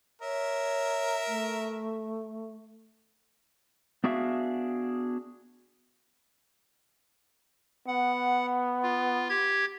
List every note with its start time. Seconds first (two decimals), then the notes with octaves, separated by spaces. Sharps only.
0.22 A#4 C#5 E5
1.27 A3
4.04 B3 D4 F#4 G#4 E5 F5
7.87 B3 F#5
8.83 F4
9.29 G4 G#6